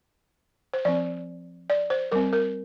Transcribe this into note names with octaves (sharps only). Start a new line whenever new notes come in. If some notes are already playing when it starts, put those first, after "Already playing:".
C5
F3 C4 D5
D5
C5
G3 C4 A#4
A#4